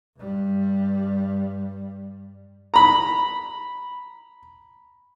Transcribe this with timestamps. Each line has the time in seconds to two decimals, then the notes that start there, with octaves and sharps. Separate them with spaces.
0.18 G2 G3
2.74 A#5 B5